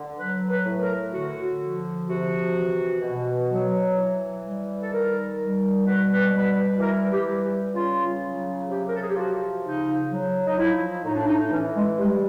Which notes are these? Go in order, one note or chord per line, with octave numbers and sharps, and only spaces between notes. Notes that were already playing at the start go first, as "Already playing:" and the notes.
Already playing: D3
F#3 B4
B4
A2
A#4
D3 F#4
F3
C3 F#4
E3
B2
F#3
E3
G3
A4
D#3 A#4
G3
B2 B4
B4
G3 B4
E3 A#4
G4
G3
C#3 F4
F#3
C3 G4
A#4
A4
G#4
G4
F3 F#4
C#3 D#4
F#3
D#4
F3 E4
A2 D#4
D4
D#4
E3 C#4
G#3
G3 G#3